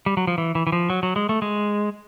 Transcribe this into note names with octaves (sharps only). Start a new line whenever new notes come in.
G3
F#3
F3
E3
E3
E3
F3
F#3
F#3
G#3
A3
G#3